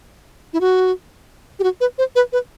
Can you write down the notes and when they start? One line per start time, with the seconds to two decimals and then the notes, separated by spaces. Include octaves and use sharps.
0.53 E4
0.61 F#4
1.59 G4
1.63 F#4
1.81 B4
1.98 C5
2.15 B4
2.33 B4